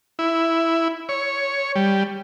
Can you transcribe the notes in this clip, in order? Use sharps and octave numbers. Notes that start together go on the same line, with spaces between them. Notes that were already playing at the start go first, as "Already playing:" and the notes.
E4
C#5
G3